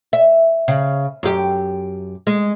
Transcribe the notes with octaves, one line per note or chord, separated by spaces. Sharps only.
E5
C#3
F#2 G4
G#3